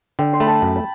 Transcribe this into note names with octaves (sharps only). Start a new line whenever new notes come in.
D3 G5
C6
A3 B5
A5
F#2
B5